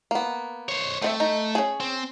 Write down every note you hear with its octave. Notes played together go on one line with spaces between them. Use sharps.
A#3 B3
C5 C#5
A3 C4 D#5 E5
D#4
C#4 G#4
C4